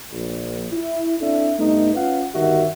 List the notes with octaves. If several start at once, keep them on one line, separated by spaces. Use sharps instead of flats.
A#1
E4
C4 D4 E4 A4 E5
G2 A3 B3 D#4
C#4 F4 B4 F5 F#5
G1 D#3 F#4 G4 E5